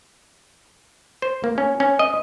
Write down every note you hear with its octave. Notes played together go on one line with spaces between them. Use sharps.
C5
A#3
C#4
C#4
D#5